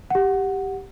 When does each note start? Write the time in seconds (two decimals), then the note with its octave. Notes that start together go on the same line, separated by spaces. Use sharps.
0.10 G4 F#5